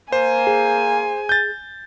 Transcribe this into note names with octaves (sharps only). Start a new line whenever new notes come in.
A#3 C5 G#5
G#4
G6 A6